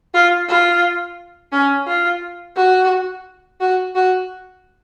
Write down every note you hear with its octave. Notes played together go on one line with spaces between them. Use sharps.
F4
F4
C#4
F4
F#4
F#4
F#4